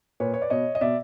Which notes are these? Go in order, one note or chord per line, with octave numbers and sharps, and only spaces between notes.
A#2 B4 C#5
C#5
D5
B2 C#5 D#5
D#5
B2 D5 E5